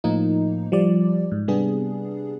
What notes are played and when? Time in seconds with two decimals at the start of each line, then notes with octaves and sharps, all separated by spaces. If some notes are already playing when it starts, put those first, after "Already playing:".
0.04 A2 F3 A#3 D#4
0.72 F3 G3 D5
1.32 G#2
1.48 C3 G3 B3 D4 G#4